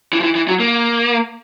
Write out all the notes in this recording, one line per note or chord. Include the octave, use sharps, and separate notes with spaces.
E3
F3
E3
E3
F#3
A#3